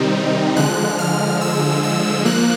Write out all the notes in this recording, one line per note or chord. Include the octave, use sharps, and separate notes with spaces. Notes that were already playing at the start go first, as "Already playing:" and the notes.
Already playing: C3 D#3 G3 C4 D#4
D3 F3 G#3 F#6
F6
E6
E6
F3 A#3 F#6